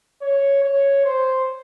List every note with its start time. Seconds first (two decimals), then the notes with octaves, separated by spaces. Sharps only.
0.21 C#5
0.64 C#5
1.05 C5